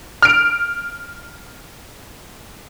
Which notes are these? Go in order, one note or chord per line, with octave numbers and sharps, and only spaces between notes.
F6 D7